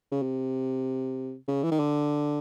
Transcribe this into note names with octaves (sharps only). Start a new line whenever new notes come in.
C#3
C3
C#3
E3
D#3
D3